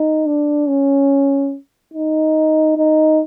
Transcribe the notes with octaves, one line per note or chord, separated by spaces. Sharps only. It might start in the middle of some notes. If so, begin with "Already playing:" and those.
Already playing: D#4
D4
C#4
D#4
D#4